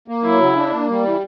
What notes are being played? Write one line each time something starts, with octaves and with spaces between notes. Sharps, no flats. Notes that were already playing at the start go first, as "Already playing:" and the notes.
A#3
F#3 E4
C#3
D4
A#3
G3
E3